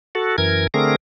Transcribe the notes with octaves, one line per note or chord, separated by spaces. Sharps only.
F#4 A4
F#2 E3 A#4 G#6
D3 A3 C4 G#4 A#4 A#6